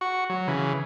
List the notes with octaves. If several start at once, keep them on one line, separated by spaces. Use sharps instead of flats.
F#4 C#6
F#3
C#3 E3